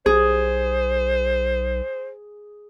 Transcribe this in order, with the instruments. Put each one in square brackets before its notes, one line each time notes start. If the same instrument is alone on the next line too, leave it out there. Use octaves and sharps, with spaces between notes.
[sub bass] B1 [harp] G#4 [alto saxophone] C5